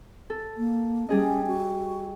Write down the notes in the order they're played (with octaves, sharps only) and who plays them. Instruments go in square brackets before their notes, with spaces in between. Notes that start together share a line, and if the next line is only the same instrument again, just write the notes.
[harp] A4
[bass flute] A#3
[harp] G3 G#4 D#5 [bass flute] C#4
[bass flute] F#4